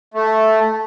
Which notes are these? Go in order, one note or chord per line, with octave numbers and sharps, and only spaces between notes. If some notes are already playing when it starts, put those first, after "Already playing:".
A3